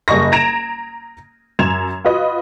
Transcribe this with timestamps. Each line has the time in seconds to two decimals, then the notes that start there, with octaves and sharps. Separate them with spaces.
0.08 F#1 G3 D#5 C#6 A#6
0.32 A#5 G#6 A#6 D7 E7 F7
1.59 F#2 G#6 E7 F7
2.04 F4 F#4 B4 D#5